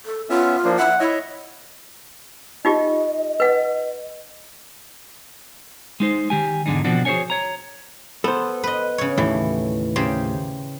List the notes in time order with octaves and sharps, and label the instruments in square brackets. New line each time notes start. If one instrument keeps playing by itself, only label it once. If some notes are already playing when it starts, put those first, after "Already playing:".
[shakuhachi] A4
[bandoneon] B3 C#4 E5 [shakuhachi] F4
[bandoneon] F3 A#3 D4
[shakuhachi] E5 [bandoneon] F#5
[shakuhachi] E4 [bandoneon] C#5 D#5 E5
[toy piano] D#4 F4 G4 [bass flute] D#5
[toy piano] B4 F#5
[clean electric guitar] G#3 D#4 C5
D#3 G4 G#5
E2 G#2 D3 G#3 D4 D#4
B2 D3 F3 C4 D4 F#4
F#4 G#4 C5 C#5 G#5
C#5 A#5
[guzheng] B3 [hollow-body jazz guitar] A4 C5
[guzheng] B4 D#5
C#3 C#5
[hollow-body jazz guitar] D#2 A2 A4 [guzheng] E3
[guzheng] C#3 G4 C5